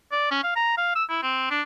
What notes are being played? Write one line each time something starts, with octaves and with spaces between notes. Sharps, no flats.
D5
C#4
F5
A#5
F5
E6
E4
C4
D4